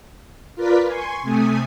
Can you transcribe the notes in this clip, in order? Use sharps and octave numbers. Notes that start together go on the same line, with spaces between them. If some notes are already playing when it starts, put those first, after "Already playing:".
F4 A#4 B4 D5 B6
G#5 C6 C#6
C3 A3 G#5 D#6